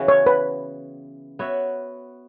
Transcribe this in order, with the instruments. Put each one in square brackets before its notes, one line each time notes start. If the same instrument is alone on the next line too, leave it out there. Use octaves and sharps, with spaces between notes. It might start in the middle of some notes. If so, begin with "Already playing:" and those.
Already playing: [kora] C#3 E3 B3 F#4
[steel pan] C#5
B4
[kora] B3 F#4 C#5 E5